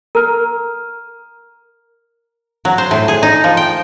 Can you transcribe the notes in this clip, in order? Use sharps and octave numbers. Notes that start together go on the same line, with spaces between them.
A#4 A#5 F6
F#3
C5
A2
G#4
D#4
F3
G5